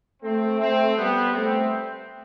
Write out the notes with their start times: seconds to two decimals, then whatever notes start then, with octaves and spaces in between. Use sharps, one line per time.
0.23 A3 C4
0.60 A3 C4
0.97 G3 B3
1.34 A3 C4